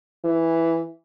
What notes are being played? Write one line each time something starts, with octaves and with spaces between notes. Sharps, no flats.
E3